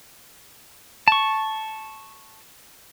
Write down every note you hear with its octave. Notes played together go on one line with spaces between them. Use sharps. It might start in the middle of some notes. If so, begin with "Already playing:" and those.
A5 C#6